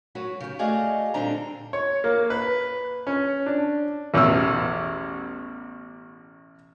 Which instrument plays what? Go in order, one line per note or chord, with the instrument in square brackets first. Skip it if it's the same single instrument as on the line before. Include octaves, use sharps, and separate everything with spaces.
[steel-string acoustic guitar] F#3 F#4 B4 C#5
C#3 G4
A3 F#4 G#4 D5 D#5 F5
A#2 D3 G3 C4 D4 A#5
[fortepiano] C#5
A#3
B4
C#4
D4
A1 E2 B2 E6